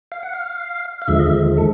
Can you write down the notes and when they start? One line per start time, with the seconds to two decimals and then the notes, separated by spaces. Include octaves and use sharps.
0.12 F5
0.23 F#5
0.33 F5
1.02 F5
1.08 D#2 D3 F3 G#3 E5
1.19 D#5
1.27 E5
1.58 A4